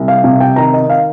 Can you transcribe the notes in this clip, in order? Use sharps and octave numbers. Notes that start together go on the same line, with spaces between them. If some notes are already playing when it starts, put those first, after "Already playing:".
Already playing: C2
F5
C3 F5
G5
D#3 A#5
D#5
F5